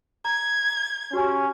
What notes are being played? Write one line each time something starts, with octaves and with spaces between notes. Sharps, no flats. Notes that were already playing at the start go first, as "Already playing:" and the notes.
A#5 G#6
C#4 F#4 G4